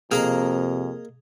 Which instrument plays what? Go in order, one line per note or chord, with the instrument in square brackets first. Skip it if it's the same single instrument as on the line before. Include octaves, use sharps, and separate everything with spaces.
[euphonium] F2 [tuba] C3 [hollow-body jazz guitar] A#3 [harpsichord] G#4 D#5 A#5